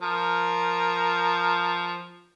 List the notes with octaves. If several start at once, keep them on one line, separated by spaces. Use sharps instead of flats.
F3 A#4